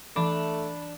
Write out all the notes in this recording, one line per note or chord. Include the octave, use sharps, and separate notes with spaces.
E3 A3 D4 B5 D6